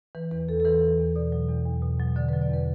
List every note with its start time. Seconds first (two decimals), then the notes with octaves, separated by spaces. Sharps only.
0.15 E3 B4
0.31 E2 B4
0.48 E2 A4
0.60 A4
0.65 E3 B4
0.82 E3
0.98 E2
1.16 B2 D5
1.32 F#3
1.49 E2
1.66 E2
1.82 B2
2.00 F#3
2.16 D3 D5
2.29 F#3 B4
2.41 D5
2.49 E2 B4